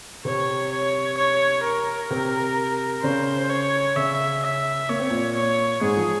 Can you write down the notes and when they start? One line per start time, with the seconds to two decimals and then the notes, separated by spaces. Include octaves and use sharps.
0.25 C3 C4 C#5
0.72 C#5
1.17 C#5
1.64 A#4
2.10 C3 C4
3.03 C#3 C#4 C5
3.50 C#5
3.96 C#3 C#4 E5
4.43 E5
4.89 A#3 C#5
4.99 C4
5.10 A#2 A#3
5.35 C#5
5.81 G#2 G#3 G#4
5.97 F3